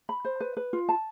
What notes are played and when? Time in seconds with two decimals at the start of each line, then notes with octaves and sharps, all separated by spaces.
0.09 B5
0.25 C5
0.40 B4
0.57 B4
0.73 F4
0.89 A5